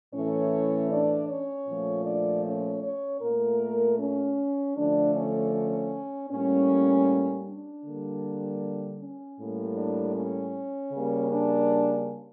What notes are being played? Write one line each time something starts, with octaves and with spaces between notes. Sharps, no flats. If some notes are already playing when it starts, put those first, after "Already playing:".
A2 E3 A3 C#4 C#5
D4 D5
C#4 C#5
A#2 F3 A3
D4 D5
C#4 C#5
C#4 C#5
A#2 A3 A#3 A#4
C#4
D3 F3 A3 D4
C#4
C#4
A2 G3 A#3 C#4
D4
D3 G3 A#3
C#4
A2 G3 A#3
D4
C#4
C#3 G3 A#3
D4